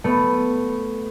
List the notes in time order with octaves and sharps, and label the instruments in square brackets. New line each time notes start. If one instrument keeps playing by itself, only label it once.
[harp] A3 B3